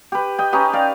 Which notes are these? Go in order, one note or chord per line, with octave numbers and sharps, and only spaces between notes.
G4 B4
D#5 G5
C#4 D#4 G4 B4
D5 F5